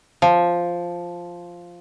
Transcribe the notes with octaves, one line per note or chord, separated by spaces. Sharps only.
F3